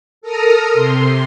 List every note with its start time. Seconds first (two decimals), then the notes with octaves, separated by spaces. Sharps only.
0.22 A4 A#4 A#5 D#6 F6
0.74 C3 C6